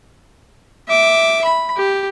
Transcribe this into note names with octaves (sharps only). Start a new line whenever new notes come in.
E5 D6
B5
G4